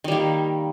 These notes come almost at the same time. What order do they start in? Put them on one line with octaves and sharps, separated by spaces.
D#3 G3 A#3